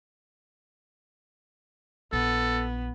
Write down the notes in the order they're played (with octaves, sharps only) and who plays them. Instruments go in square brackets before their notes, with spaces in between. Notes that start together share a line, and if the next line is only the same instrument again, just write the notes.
[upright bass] A#1 [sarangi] B3 [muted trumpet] A4